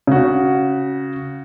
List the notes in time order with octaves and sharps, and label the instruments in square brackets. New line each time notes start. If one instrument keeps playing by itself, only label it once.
[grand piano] C#3 F#4